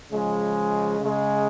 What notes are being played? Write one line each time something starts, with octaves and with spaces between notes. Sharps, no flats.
C#3 F3 G#3
C#3 G#3